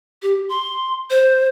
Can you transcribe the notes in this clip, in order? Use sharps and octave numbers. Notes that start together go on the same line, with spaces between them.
G4
C6
C5